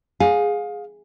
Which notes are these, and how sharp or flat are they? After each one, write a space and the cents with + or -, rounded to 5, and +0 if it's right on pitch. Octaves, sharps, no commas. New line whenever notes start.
G#4 +0 F5 +25